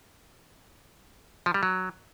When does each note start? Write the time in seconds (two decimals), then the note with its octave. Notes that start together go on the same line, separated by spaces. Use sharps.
1.46 F3
1.54 G3
1.63 F#3